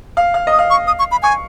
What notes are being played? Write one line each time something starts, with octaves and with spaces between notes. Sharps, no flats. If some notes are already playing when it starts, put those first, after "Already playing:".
F5
F5
D#5
D#6
F5
C#6
D#6
C#6
B5
G#5 C#6